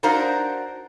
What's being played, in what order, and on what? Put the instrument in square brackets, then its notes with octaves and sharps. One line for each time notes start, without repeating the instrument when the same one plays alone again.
[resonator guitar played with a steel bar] D4 D#4 F#4 A#4 C5 F5